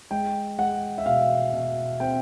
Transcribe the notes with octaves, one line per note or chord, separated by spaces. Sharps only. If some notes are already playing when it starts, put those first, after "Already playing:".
G#3 G5
G#3 F#5
E5
B2 F5
B2
C4 G5